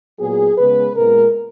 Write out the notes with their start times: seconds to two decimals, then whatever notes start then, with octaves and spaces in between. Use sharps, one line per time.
0.19 A#2 F#3 B3 G#4
0.57 C#3 G#3 B3 B4
0.95 A#2 G#3 B3 A#4